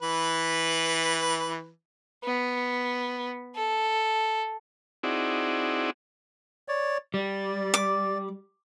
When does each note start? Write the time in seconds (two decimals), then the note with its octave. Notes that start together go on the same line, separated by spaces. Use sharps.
0.02 E3 B4
2.24 B3
3.56 A4
5.03 C4 D#4 E4 F#4 G#4 D5
6.68 C#5 D5
7.14 G3 D5
7.74 D6